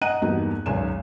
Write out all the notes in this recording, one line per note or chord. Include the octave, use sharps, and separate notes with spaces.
D#5 F#5 G#5 A#5 F#6 D#7
E2 G2 A#3 D#4 F#4
G#1 C#2 F#2 G#5 E7